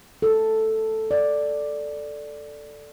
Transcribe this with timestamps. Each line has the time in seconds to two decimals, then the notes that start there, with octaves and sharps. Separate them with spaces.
0.22 A4
1.11 D5